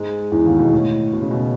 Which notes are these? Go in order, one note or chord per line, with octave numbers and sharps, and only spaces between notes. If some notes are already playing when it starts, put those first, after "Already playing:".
Already playing: G#2 G#3
E2 E3
D#2 D#3
B2
A2
B2
C#3
B2